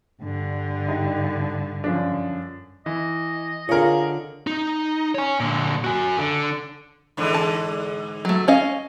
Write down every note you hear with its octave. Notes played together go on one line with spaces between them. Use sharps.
G2 D3
D#4 G4
F#2 F3 D4
E3 D#5
D3 F4 G#4 A#4 C#5
D#4
C#5 G#5
A#2 D3
F#4 G#5
D3
G#2 D3 E3
A5
F#3 A3
C#4 D#5 F5